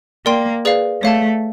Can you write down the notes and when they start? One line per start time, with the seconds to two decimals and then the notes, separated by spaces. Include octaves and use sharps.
0.26 A#3 A#4 D5 G5 C6
0.65 G#4 B4 D5 F5
1.03 A3 C#5 F5 A5